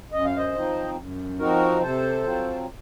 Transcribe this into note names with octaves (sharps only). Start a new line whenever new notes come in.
F#2 D#5
F5
C5 D#5
F3 C4 D#4
F#2
F3 C4 D#4 F#4 A#4
C3 A4 C5
F#3 C4 F4